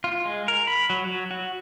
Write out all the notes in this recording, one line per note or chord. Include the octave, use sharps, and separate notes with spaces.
F4
G#3
A#4
B5
F#3
F#3
F#4